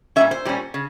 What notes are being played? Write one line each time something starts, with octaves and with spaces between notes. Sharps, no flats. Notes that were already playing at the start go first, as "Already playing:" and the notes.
A#2 G3 C#4 E5
C5
A#2 G3 C#4
C#3